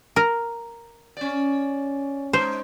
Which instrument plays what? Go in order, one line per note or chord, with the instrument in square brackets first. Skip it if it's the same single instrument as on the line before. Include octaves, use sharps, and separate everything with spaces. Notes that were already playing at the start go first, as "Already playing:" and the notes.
[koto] A#4
[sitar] C#4 D5
[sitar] G#3 D#4 [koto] C5